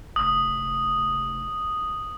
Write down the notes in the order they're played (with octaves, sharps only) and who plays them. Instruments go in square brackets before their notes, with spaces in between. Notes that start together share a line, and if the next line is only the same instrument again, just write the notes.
[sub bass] F1 [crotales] D#6